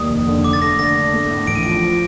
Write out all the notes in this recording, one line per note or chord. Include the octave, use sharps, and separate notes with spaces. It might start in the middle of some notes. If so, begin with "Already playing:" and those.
Already playing: D#2 G3 D#6
F1
D3
D3 D6
A6
A3 A#6
D3 A#6
D4
A3
A2
A1 D7
D#7
F3 D7
F3